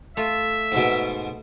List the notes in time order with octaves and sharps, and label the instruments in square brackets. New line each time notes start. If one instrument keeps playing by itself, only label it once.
[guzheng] A3 F4 [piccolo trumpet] E5
[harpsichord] G#2 B2